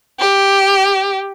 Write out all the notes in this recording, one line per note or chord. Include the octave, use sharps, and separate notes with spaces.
G4